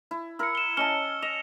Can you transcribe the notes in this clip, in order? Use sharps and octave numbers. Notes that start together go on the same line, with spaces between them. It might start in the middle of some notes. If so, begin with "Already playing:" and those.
E4
E4 A#4 E6 C#7
E7 G7
C#4 D#5 A5 F6 C#7 G7
D#5 E7 F7